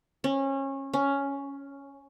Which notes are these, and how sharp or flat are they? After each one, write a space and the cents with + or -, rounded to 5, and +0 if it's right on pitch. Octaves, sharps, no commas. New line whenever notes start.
C#4 -25
C#4 +5